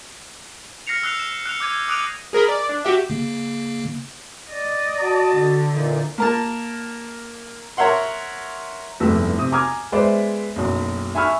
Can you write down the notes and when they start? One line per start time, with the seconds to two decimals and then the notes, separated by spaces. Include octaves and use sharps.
0.87 F6 A#6 C7 C#7 F7
1.03 E6 F#6 C7 C#7 F7
1.20 E7
1.46 F#6 C#7 F7
1.60 D6 G6 G#6 D#7
1.88 D6 D#6 F#6 D7 D#7 F7
2.33 G#4 A#4 D#5 B5
2.48 D5
2.69 D4
2.85 F#4 G4 E5
3.10 C#3 A#3
4.52 D5 D#5
5.00 F#4 A5
5.37 D3
5.73 A#2 E3 D#4
6.18 A#3 A#4 A5
7.77 A#4 C#5 E5 F#5 C6
9.00 F1 E2 G2 A3 B3 E6
9.38 C3 D#6
9.52 G#5 A#5 D6 D#6 F6 G#6
9.92 G#3 B3 B4 C5 D5 E5
10.56 F#1 B1
11.15 E5 G#5 B5 C#6 E6 F6